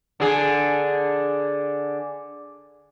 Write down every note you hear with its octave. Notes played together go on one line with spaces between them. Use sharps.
D3 G#4